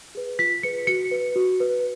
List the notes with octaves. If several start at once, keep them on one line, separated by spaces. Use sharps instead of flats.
G#4 B4
F4 B6
G#4 B4 C#7
F#4 C#7
B4
F#4
B4